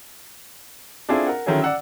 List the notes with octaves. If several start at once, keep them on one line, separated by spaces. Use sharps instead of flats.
C4 D4 E4 F4 G#4 A4
A#4 F#5
D3 D#3 F#3 C#4 E4 G#4
D5 F#5 E6